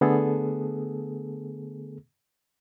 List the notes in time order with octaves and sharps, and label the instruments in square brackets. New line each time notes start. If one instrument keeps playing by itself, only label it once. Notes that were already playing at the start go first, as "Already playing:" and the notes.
[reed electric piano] D3 A3 B3 G#4 A4